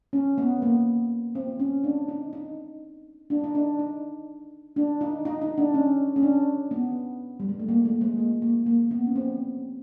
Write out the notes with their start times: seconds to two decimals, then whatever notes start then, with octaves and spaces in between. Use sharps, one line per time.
0.13 C#4
0.38 B3
0.62 A#3
1.35 C4
1.60 C#4
1.84 D4
2.08 D#4
2.33 D#4
3.30 D4
3.44 D#4
3.55 D4
3.79 D#4
4.76 D4
5.01 D#4
5.25 D#4
5.41 D#4
5.58 D4
5.74 C#4
6.16 C#4
6.23 D4
6.71 B3
7.40 G3
7.49 G#3
7.59 A3
7.68 A#3
7.85 A3
8.01 G#3
8.18 A#3
8.42 A#3
8.66 A#3
8.91 B3
9.06 C#4
9.16 C4